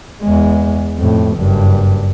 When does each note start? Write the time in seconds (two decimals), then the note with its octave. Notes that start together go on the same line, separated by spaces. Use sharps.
0.23 E2 G#3
0.97 F2 A2
1.36 F#1 G2